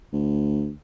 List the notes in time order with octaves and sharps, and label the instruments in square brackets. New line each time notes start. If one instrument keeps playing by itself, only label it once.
[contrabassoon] D2